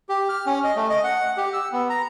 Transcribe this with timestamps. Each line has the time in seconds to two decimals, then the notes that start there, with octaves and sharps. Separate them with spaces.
0.09 G4
0.29 F6
0.46 C#4
0.64 D#5
0.76 A3
0.90 D#5
1.04 F#5
1.37 G4
1.53 E6
1.72 B3
1.90 A#5